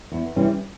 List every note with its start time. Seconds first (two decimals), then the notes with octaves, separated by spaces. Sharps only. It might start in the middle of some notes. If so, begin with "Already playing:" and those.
0.12 E2
0.36 C3 E3 G3 C#4